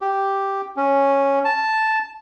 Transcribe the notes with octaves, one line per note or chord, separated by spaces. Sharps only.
G4
C#4
A5